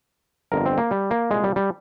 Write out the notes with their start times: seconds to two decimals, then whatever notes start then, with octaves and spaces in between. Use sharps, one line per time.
0.52 G1 F2 D3 A#4
0.66 C4
0.78 A#3
0.91 G3
1.11 A#3
1.30 C2 A#2 G#3
1.44 G3
1.56 G3